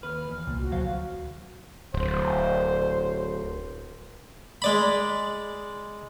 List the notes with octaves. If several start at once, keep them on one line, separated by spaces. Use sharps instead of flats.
D#2 B4 F6
E2
C2 A#2
F#4
D2 A#2 F3 F#3 C5 F5
D1 C5
G#3 D5 B5